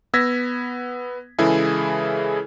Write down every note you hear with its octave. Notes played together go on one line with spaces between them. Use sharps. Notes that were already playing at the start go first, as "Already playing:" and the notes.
B3 E6 G#6 A#6 B6
C#3 E3 G#3 E4 G#4 A4